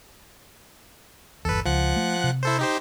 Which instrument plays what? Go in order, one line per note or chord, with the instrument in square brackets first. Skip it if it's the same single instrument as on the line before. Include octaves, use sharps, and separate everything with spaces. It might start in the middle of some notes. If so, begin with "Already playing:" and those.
[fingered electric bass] G1 E2 [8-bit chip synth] A4 B4
[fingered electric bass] C#2 [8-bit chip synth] F3 F#5 F#6
[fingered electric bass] A3
C3
[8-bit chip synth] E4 A4 C5
D#4 G4 C5